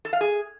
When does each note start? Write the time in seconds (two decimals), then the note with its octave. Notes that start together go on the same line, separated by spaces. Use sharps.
0.05 A4
0.13 F5
0.21 G#4